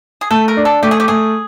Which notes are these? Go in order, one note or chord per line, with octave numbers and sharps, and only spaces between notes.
G#4
A3 A4
A#4
D4
A4
A3 G4
G#4
G4
A3 G#4